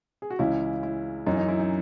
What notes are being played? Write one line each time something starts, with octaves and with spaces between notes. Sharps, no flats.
G#4
F#4
C#2 C#3 E3 E4
E4
F#2 E3 D#4
D#4
E4
D#4